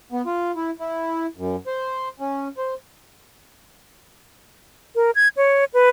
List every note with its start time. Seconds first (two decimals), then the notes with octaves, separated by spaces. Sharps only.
0.12 B3
0.26 F4
0.56 E4
0.80 E4
1.37 F#2
1.67 C5
2.20 C#4
2.58 C5
4.95 A#4
5.15 G#6
5.37 C#5
5.74 B4